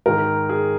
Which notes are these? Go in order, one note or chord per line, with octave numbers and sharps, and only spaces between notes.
G#2 D#3 A#4
G#4